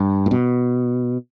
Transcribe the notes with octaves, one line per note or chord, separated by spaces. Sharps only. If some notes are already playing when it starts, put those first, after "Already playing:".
Already playing: G2
A2
B2